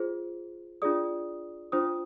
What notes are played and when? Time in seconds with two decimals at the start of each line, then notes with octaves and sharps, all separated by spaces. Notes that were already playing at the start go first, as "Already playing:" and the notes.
Already playing: F4 G#4 C5
0.82 D4 F4 G#4 D5 D#6
1.72 D4 F4 C5 D#6